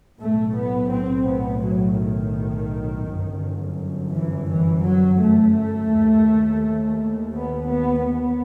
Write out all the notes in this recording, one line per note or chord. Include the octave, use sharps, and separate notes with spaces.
B1 A2 A3
B3
C4
B3
F#3
D#3
G1 F#2
E3
E3
F#3
A3
D#2
B3
B3
B3